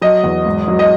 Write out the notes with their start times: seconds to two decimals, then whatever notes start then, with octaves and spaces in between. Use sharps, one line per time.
0.01 F#3 D#5
0.23 E2
0.46 G#2
0.68 F#3
0.79 D#5